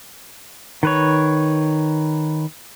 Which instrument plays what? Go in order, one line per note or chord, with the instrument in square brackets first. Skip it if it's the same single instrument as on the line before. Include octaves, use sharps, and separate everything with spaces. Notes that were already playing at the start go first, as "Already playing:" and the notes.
[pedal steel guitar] D#3 B4 C#5